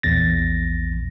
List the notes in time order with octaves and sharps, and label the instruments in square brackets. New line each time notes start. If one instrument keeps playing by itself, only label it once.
[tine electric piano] A#1 E2 A6 A#6